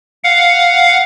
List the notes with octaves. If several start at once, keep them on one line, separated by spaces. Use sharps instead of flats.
F5 F#5